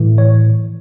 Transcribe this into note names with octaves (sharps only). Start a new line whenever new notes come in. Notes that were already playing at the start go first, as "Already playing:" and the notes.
Already playing: A2 E3
C#5